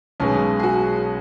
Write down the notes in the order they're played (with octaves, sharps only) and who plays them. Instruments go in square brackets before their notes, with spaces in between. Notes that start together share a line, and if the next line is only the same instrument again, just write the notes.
[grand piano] B1 B2 G#3 [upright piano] C#4
[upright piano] G#4
F#4